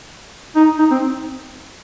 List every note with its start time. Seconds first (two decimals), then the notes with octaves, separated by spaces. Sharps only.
0.56 D#4
0.79 D#4
0.91 C4